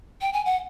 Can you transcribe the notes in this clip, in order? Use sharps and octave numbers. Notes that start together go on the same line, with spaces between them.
G5
G#5
F#5